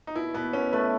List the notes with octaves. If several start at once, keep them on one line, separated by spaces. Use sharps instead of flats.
D#4
B2 E4
B2 B3
B2 C#4
A3 B4